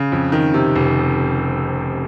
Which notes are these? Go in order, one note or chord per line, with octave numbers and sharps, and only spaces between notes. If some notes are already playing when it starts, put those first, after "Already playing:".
Already playing: C#3
F2
D#3
C3
F1